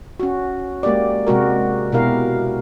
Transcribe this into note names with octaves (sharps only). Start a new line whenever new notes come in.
C#4 F#4
G#3 A#3 G4 D5
C3 G#3 F#4 A#4
B2 E4 G4 A#4 F5